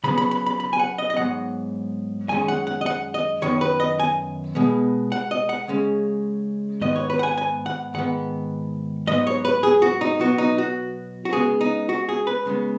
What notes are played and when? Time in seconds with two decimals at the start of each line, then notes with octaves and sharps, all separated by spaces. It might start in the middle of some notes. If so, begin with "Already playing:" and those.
0.04 C#3 F#3 B3 B5
0.18 B5
0.31 B5
0.46 B5
0.60 B5
0.73 G#5
0.79 F#5
0.98 D#5
1.10 D#5
1.17 G#2 F#3 B3 F#5
2.29 F#2 D#3 G#3 C#4 G#5
2.48 F#5
2.67 F#5
2.81 D#5
2.86 F#5
3.14 D#5
3.42 F#2 D#3 B3 C#5
3.61 B4
3.80 D#5
4.00 G#5
4.55 B2 G#3 B3
5.12 F#5
5.31 D#5
5.49 F#5
5.68 C#3 G#3 C#4
6.81 G#2 D#3 B3 D#5
6.96 C#5
7.10 B4
7.19 F#5
7.23 G#5
7.38 G#5
7.66 F#5
7.94 G#2 D#3 B3 F#5
9.07 G#2 F#3 B3 D#5
9.27 C#5
9.45 B4
9.63 G#4
9.82 F#4
10.01 D#4
10.19 B2 F#3 B3 F#4
10.38 D#4
10.58 F#4
11.25 F#4
11.33 C#3 G#3 B3 G#4
11.61 D#4
11.89 F#4
12.09 G#4
12.27 B4
12.46 C#3 G#3 B3